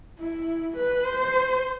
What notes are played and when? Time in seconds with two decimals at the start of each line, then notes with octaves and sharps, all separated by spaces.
0.18 E4
0.76 B4
1.06 C5